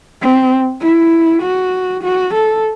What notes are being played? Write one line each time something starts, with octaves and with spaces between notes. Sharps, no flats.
C4
E4
F#4
F#4
A4